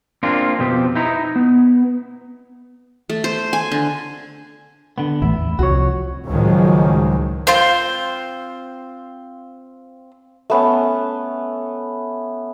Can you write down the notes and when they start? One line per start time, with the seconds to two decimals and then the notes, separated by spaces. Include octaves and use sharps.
0.23 A#3 C4 D4 F4
0.59 F2 B2 C4 G4
0.95 D#4 E4 A#5
1.36 B3
3.09 A3
3.24 C5
3.53 G#5
3.71 D3
4.98 D3 B3
5.22 A1 E2 A3 E4
5.40 E2
5.59 C2 F3 F#4 C#5
6.27 C#2 A2 D#3 F3 F#3 G#3
7.47 C4 F4 C5
10.50 A3 B3 C#4